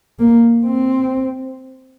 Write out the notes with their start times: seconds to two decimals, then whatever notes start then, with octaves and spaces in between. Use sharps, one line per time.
0.19 A#3
0.65 C4